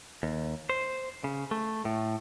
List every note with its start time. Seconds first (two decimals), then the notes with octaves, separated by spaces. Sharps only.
0.23 D#2
0.70 C5
1.24 C#3
1.51 A3
1.85 A2